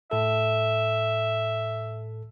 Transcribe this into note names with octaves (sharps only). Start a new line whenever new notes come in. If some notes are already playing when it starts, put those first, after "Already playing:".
A2 A4 E5